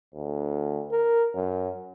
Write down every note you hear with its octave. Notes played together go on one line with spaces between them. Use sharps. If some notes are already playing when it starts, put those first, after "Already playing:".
D2
A#4
F#2